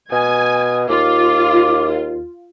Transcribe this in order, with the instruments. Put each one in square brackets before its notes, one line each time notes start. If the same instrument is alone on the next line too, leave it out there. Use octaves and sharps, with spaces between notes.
[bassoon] B2 [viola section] G#5 [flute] D#6
[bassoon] D#2 [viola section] F4 [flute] D6